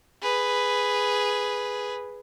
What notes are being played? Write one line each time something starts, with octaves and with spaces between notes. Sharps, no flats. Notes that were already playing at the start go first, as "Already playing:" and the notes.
G#4 B4